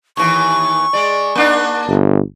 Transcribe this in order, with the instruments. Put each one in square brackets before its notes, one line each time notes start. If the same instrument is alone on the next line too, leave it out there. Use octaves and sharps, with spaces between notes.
[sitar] D#2 E3 [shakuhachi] C#6
[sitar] G#3 D5
A#3 D4 D#4
[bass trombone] G1